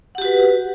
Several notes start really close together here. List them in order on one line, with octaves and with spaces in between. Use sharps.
F#5 G4 F#4 B4